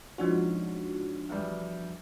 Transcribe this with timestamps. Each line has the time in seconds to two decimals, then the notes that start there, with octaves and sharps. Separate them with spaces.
0.18 G#2 F3 C#4 D4 F#4
1.29 E2 G3